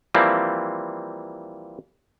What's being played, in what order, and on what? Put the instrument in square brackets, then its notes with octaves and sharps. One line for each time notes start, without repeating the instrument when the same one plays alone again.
[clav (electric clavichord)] E3 F3 G3 A#3 C4